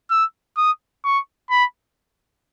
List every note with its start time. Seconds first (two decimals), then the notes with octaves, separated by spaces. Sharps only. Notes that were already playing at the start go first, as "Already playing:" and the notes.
0.11 E6
0.57 D#6
1.05 C#6
1.50 B5